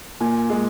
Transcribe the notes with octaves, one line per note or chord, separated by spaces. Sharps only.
A#2 G#5
G#3